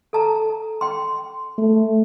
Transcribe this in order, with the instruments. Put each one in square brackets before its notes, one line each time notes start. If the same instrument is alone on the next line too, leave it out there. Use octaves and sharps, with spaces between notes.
[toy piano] A4 A5 A#5
G5 C6
[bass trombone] A3